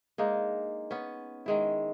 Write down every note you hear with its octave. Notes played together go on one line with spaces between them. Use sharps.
G#3 A#3 D4 D#4
B3 C#4
D#3 G#3 E4